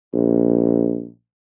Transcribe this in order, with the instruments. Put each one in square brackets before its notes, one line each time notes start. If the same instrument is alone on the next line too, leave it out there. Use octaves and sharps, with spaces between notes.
[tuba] A#1